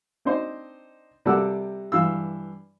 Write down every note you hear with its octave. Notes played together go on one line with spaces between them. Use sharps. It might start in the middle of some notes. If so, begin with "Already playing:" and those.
C4 D4 D#4 C5
C3 G3 A4 A#4 F#5 E6
G2 E3 F5 E6